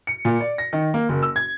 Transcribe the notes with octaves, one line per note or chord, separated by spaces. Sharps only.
C#7
A#2
D5
A#6
D#3
A#3
F#1
E6
G#6